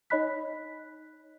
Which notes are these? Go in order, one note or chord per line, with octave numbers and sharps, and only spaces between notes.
D#4 C#5 D#5 B5 F#6 B6